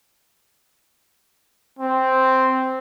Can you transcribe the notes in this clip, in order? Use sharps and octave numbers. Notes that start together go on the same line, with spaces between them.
C4